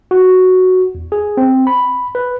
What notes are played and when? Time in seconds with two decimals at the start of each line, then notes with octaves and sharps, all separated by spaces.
0.11 F#4
0.95 E2
1.12 G#4
1.37 C4
1.67 B5
2.15 B4